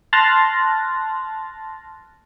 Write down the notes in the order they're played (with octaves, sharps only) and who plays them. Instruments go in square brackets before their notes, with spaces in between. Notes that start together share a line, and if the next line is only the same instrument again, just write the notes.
[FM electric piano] A5 C6 F6 F#6 A6 A#6